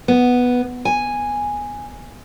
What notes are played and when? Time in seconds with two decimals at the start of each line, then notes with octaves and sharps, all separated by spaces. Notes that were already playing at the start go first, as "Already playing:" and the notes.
0.08 B3
0.85 G#5